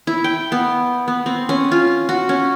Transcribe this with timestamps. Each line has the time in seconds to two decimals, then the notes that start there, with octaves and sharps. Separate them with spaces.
0.07 E4
0.24 G5
0.52 B3
1.08 B3
1.26 C4
1.49 C#4
1.72 F4
2.09 F#4
2.29 C#4